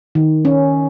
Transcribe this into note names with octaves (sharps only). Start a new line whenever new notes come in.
D#3
C#4